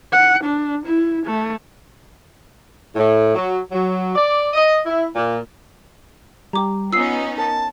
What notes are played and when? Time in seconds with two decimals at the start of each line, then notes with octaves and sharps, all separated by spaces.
0.13 F#5
0.44 D4
0.86 E4
1.26 A3
2.96 A2
3.35 F#3
3.72 F#3
4.15 D5
4.54 D#5
4.86 E4
5.16 A#2
6.53 G3 G4 A#5 D6
6.93 B3 C#4 D#4 F4 D#6 E6 C7
7.38 A#4 A5